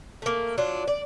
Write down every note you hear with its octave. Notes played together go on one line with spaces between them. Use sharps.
A3 A#3
F#3 D4 F4
D5